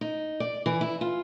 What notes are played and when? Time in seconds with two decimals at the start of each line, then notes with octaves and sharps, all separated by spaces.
0.01 D#4
0.40 D5
0.66 E3
0.81 E4
1.01 F4